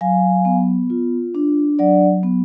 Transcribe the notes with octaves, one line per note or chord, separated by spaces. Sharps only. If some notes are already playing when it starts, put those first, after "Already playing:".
F#3 F5 G#5
B3
F4
D4
F#3 D5 F#5
B3